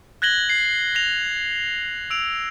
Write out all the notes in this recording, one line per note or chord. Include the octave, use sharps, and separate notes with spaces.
F#6 G#6 A#6 F#7 G7
C7
A#6 F7
E6 D7 F7